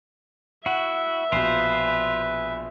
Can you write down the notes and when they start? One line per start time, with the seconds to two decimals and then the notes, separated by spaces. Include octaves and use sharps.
0.66 E4 F#4 E5 F#5
1.32 A#1 B2 F4 B4 C5